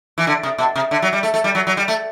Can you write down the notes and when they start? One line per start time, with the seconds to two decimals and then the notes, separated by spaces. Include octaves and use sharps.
0.18 E3
0.27 D3
0.43 C3
0.58 B2
0.76 C3
0.91 D3
1.02 F#3
1.13 G3
1.23 A3
1.34 A3
1.44 G3
1.55 F#3
1.67 F#3
1.77 G3
1.88 A3